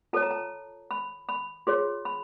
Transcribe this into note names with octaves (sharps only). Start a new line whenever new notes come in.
F4 A4 C#5 A5
A#5
A5
B5
B5
F4 G#4 C#5 C6
B5